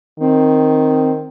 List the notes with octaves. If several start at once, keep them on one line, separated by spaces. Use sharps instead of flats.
D#3 C4